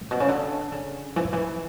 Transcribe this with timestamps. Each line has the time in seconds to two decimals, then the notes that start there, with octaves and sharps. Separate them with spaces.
0.01 A2
0.11 B2
0.20 C#3
0.29 D3
0.72 C#3
1.16 E3
1.25 D3
1.33 E3